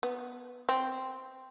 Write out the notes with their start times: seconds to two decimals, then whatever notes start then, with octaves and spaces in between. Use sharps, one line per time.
0.03 B3
0.69 C4